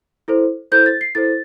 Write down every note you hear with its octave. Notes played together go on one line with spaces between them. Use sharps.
E4 A4 C5
E4 A4 C5 G6
A6
C7
E4 A4 C5 A6